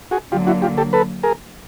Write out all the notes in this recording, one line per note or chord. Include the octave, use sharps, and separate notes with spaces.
F#4 G#4
D3 F#3 A#3 F4 G4
E4 F#4
F4 G4
G4 A4
A4 B4
G#4 A#4